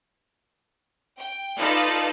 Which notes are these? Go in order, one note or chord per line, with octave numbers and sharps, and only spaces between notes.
G5
D#4 F4 A4 B4 D5